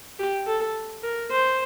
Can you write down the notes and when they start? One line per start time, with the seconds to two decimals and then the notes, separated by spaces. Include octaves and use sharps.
0.19 G4
0.47 A4
1.03 A#4
1.32 C5